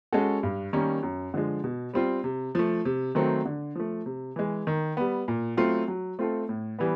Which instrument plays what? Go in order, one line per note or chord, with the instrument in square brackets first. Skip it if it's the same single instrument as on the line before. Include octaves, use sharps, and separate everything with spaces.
[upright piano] G#3 C#4 F#4 A4
G2
D#3 G3 A#3 C#4
F#2
D3 F3 G#3
B2
G3 C4 F4
C3
F3 A3
C3
D#3 F#3 A3 C4
D3
F3 A3
C3
E3 G#3
D#3
G3 B3
A#2
F#3 A3 C4 F4
F#3
A3 C4 F4 A4
A2
E3 G3 B3